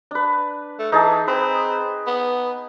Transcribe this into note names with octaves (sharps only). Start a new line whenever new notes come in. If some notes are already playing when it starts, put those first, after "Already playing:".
D4 B4
A3
E3 D#4 G#4 A5
C4 B4
B3